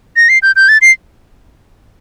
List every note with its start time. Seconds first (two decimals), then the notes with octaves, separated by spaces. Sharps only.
0.16 A#6
0.29 C7
0.42 G6
0.56 G6
0.69 A6
0.82 C7